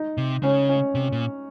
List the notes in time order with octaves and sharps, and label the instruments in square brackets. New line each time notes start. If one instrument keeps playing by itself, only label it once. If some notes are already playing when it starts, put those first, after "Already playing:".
Already playing: [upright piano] D#4
[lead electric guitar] C3
[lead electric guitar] C#3 [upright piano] C#4
[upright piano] C#4
[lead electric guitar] C3
A#2